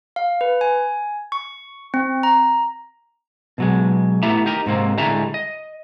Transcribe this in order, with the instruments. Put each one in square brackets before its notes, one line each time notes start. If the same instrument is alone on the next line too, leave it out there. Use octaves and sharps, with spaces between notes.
[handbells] F5
B4
G#5
C#6
C4
A#5
[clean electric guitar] B2 F#3 G#3
A3 B3 E4 G4 E5 A#5
D#4 G4 A#4
G#2 C3 A#3 C4
D2 A2 G3 G#3 E5 A#5
D#5